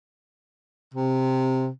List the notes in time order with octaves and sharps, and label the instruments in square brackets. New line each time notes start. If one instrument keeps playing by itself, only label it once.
[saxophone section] C3